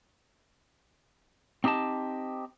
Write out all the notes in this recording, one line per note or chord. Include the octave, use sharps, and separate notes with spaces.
C4 D#4 G4 D#5 A5